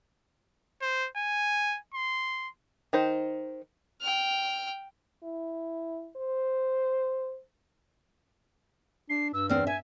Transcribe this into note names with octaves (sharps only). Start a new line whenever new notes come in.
C5
G#5
C6
D#3 D#4 C5
G5 F6
E4
C5
D4 C7
G2 E6
E2 C4 F6
E5 G#5